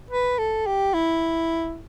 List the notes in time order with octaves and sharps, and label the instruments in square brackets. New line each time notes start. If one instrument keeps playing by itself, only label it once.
[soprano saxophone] B4
A4
G4
E4